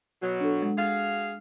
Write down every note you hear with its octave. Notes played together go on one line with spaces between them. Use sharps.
B2 F#3
D4 A4
G#3
F#4 G#4 F5